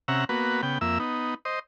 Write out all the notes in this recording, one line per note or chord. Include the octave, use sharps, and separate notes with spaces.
C3 C#4 E5 F#5 A#5
A#3 B3 F#4 B4
C#3 B3 G5
F2 A#3 E5 E6
B3 D#4
C5 D#5